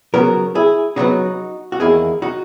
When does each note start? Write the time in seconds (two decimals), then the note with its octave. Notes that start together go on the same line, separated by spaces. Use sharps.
0.14 C#3 F#3 B3 F#4 A#4
0.55 E4 G#4
0.96 C#3 F#3 B3 D#4 F#4
1.72 F#4
1.80 E2 D#3 A#3 E4 G#4
2.22 D#4 F#4